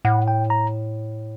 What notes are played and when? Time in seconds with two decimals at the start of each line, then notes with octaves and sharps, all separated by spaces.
0.05 A2 F#5
0.28 G5
0.50 A#5